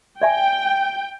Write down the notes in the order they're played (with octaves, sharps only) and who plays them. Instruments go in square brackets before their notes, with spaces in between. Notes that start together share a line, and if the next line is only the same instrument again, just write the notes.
[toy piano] D5 E5 G#5 [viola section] G5